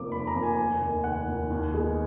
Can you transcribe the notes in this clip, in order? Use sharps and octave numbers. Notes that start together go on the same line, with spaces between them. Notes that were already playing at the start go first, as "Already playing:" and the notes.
Already playing: F1 F2 F3 A#3 D6
F1 B5
A#5
F2 F3 A#3
G#5
F1 G#5
D#2 D#3
F1 F#5
D#2 D#3
D#2
D#3 G#3 B3 D#4